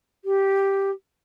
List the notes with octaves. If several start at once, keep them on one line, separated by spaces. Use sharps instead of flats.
G4